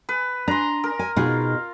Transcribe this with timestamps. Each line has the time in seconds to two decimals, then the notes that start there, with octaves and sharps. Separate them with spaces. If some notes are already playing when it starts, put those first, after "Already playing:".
0.09 B4
0.48 D4 A#5 C6
0.84 A#4
0.99 G#5
1.16 B2 D#4 F4 G#4